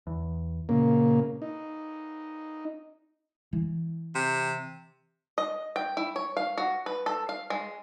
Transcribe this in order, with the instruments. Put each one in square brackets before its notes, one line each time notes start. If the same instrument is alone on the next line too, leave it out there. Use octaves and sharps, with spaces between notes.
[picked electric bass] E2
[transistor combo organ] A#2 C#3 A#3
D#4
[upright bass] E3
[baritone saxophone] C3
[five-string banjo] D#5
G5
E4
C#5
F5
F#4
B4
A4
F5
G#3